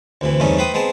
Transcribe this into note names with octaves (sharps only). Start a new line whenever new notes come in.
D2 C3 E3
E2 G2 C3 A3 C#4 D#4
A3 B4 C5 G5 D#6
G#3 B3 C4 A5